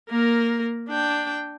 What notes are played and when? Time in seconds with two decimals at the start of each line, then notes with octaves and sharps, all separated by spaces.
0.10 A#3 A#4
0.89 D4 G5